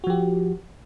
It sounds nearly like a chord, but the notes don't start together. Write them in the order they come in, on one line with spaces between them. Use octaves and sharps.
F#4 F3 G4